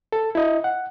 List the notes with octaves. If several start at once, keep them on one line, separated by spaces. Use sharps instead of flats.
A4
E4 D#5
F#5